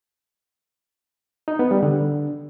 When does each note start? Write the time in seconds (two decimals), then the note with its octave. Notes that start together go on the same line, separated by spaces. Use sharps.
1.48 D#4
1.59 B3
1.71 G3
1.83 D3